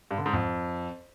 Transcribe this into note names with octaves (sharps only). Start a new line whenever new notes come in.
G2
D3
G#2
F2